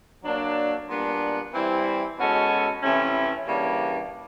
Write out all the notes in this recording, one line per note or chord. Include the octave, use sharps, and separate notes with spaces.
F#3 A#3 D4
A#2 G3 B3 D4
E3 G3 C4 E4
B2 G#3 C#4 F#4 A4
C3 E3 A3 C#4 E4
C#3 E3 G3 A#3 D4